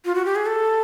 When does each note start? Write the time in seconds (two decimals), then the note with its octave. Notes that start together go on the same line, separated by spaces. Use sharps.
0.05 F4
0.15 F#4
0.25 G4
0.36 G#4
0.46 A4